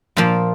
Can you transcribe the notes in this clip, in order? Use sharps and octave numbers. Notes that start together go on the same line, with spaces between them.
A#2 F3 A#3 F4